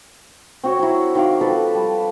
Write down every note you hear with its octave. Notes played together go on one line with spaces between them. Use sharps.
C4 F#4 C#5
F#3 E4
D#3 F#4 F5 D6
F3 A4 B4 A5
G3